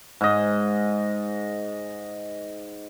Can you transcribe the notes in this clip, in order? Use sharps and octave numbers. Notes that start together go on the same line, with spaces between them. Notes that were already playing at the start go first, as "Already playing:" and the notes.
G#2 D#5